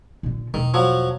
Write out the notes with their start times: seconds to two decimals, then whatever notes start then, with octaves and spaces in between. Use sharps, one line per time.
0.23 A#2 D3
0.54 E1 D#3
0.74 F3 F#3